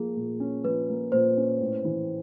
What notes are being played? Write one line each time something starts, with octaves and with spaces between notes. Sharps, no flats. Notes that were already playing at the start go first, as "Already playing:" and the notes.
Already playing: F3 A#3 G#4
A#2
C#4
F3 B4
A#3
A#2 C5
C#4
A2
E3